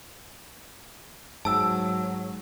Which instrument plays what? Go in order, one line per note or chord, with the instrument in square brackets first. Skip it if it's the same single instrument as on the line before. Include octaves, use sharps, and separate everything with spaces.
[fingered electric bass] G#2 [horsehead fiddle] F#3 [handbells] A5 E6